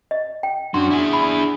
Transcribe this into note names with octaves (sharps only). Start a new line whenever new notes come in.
D#5
G5
F#2 D4 F#4 C6
E4 G#4
B5